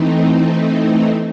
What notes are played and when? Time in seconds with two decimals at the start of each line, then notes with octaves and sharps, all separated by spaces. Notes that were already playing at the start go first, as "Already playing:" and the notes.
Already playing: E3 A3 C4 D#4